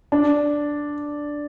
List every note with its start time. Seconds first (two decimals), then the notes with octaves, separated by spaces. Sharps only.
0.12 D4